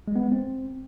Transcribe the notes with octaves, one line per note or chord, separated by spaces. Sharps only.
G#3
B3
G#3
C4